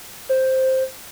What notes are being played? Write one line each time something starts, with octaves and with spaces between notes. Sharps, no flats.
C5